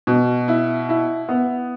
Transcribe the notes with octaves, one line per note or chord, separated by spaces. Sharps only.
B2
E4
E4
B3